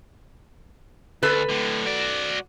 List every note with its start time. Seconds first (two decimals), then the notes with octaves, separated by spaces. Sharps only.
1.23 D2 A4 B4
1.49 A2 D3
1.86 F#4 D5